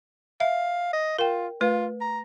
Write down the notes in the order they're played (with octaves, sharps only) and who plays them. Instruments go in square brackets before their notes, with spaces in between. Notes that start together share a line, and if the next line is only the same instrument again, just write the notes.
[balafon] E5 [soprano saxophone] F5
[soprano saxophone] D#5
[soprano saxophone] F4 [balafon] A#4 G5
[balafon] A3 B4 [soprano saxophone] F4
[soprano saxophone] A#5